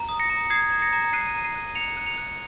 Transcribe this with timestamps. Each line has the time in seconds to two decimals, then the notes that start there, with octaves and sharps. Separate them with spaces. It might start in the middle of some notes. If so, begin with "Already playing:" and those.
Already playing: A#5
0.09 D#6
0.20 A#6 C#7
0.30 A#5
0.50 D#6 G#6 C7
0.72 A#5
0.82 A#6 C#7
0.93 A#5
1.13 F#6 C7 D#7
1.34 A#5
1.44 C7 D#7
1.55 F#6
1.75 A#5 C#7 F7
1.97 F#6
2.06 C#7 F7
2.18 F#6